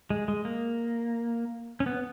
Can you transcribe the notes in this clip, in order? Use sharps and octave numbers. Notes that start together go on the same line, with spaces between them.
G#3
G#3
A#3
C#4
B3